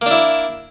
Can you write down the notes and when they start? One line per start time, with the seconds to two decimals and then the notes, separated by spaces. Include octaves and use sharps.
0.01 A#3
0.06 D4
0.11 E4